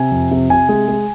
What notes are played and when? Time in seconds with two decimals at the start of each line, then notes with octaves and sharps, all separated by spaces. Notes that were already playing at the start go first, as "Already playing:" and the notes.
Already playing: C3 G#5
0.12 F2
0.31 C3
0.50 C3 G#5
0.69 G#3
0.88 G#3